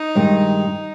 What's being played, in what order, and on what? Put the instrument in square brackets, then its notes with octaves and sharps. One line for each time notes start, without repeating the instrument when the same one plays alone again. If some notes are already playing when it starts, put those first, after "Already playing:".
Already playing: [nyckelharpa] D#4
[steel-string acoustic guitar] G2 D#3 G#3